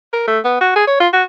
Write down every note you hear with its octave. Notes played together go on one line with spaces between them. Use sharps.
A#4
A3
B3
F#4
G#4
C#5
F4
F#4